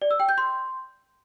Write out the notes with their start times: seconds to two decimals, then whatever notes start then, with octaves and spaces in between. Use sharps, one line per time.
0.02 D5
0.11 E6
0.20 G5
0.29 G6
0.38 C6